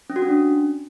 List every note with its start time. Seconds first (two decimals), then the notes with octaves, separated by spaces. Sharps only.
0.10 C#4
0.16 F#4
0.22 C#4
0.29 D4